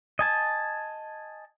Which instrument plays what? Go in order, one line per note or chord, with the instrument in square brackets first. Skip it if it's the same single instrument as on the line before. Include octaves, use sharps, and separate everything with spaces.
[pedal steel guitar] D#5 G#5 A5